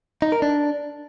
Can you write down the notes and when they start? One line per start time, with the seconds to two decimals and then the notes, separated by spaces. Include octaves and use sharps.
0.22 D#4
0.32 A#4
0.42 D4